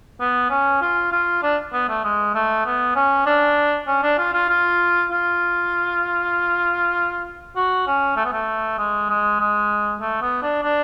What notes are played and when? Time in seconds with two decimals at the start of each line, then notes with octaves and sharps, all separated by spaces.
0.20 B3
0.50 C#4
0.82 F4
1.12 F4
1.43 D4
1.73 B3
1.89 A3
2.04 G#3
2.35 A3
2.66 B3
2.96 C#4
3.26 D4
3.87 C#4
4.03 D4
4.18 F4
4.33 F4
4.49 F4
5.11 F4
7.56 F#4
7.87 C#4
8.16 A3
8.25 B3
8.33 A3
8.78 G#3
9.10 G#3
9.40 G#3
10.01 A3
10.22 B3
10.43 D4
10.63 D4